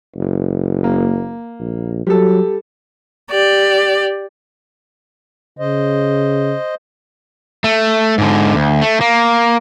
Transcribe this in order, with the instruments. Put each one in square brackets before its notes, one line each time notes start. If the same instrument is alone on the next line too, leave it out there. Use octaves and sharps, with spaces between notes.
[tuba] F#1
[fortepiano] A#3
[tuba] A#1
[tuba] F#3 [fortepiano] G3 A4
[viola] G4 D5
[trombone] C#3 [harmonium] C5 D#5
[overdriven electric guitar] A3
G#2 D3
D2
A3
A#3